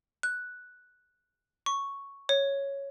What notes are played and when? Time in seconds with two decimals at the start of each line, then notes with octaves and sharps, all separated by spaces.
0.23 F#6
1.66 C#6
2.29 C#5